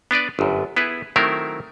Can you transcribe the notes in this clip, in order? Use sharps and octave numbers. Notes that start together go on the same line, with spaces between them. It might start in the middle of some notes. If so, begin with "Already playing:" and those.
B3 D4 B4 D5
G1 F#2
B3 E4 G#4 B4
D#3 F#3 A3 C4 E4 A#4